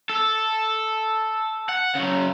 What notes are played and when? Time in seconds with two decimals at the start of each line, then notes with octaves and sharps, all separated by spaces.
0.09 A4
1.69 F#5
1.95 C#3 F#3